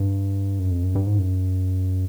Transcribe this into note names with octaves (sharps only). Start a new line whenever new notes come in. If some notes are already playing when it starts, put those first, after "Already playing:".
Already playing: G2
F#2
F2
F#2
G2
G#2
F#2